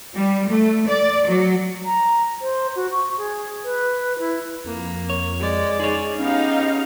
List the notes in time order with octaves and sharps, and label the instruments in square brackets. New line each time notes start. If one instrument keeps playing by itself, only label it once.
[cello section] G3
A3
D5
F#3
[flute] A#5
C5
F#4
C#6
G#4
B4
E4
[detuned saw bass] F2 [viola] A#3
[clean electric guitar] C#5
[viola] G#3 D5
[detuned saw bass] D#4 [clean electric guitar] G#4 C#5
[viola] B3 G4 [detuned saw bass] C#4 [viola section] D#4 F5